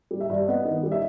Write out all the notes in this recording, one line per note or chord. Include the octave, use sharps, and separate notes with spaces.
G3
E5
G2
B3 D#5
D#3
G3
E5